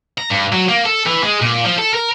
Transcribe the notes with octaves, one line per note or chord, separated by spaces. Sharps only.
A#5
G2
F#3
A#3
A4
E3
G#3
A#2
F3
A4
A#4